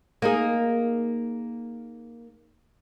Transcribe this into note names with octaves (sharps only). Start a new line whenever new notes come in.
A#3 D#4 G#4